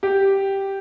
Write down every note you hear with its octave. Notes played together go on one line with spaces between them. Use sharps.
G4